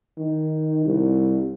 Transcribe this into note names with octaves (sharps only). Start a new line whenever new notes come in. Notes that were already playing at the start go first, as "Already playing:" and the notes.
D#3
C2